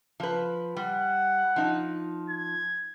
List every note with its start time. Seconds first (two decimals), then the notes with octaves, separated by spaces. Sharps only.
0.20 F3 B4
0.77 G3 F#5
1.56 F3 D#4
2.30 G#6